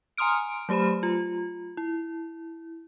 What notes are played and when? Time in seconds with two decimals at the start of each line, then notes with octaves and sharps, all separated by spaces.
0.18 G#5 A#5 C6 D#6 F6 D7
0.69 F#3 A3 G4 C5 B5
1.03 F4
1.77 E4